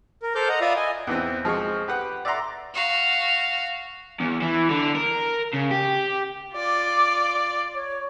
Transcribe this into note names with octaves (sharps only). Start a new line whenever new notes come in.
A#4
A4 C5 D6 F6 G6
D#5 F#5 A#5
F4 D5 E5 F5 B5 D#6
D#5 G#5
E2 E3 C4
F3 G#3 C4 C#6
G4 B4 F#5
D5 E5 F#5 A#5 C6
F#4 F5
E2
E3
D3
A#4
C#3
G4
F4 D5 D6
C#5